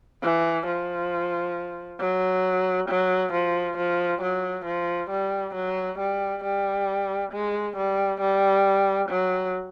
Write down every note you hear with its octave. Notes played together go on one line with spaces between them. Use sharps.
E3
F3
F#3
F#3
F3
F3
F#3
F3
G3
F#3
G3
G3
G#3
G3
G3
F#3